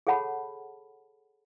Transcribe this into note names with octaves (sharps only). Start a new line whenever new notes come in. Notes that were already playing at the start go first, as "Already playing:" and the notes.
G#4 A4 C#5 F#5 A5 B5